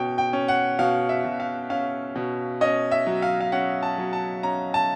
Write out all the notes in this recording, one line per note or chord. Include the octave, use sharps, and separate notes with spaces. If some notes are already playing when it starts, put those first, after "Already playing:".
Already playing: B2 C#4 G5
G5
C#4
F#5
B2 F5
E5
B2
F5
C#4 F5
B2
C#4 D#5
E5
F#3
F5
F5
C#4 F#5
A5
F#3
A5
C#4 A#5
A5